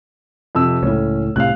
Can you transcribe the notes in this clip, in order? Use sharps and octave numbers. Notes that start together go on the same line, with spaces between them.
F2 C3 E6
C#2 A2 C#4
C2 A2 C3 F5 F#6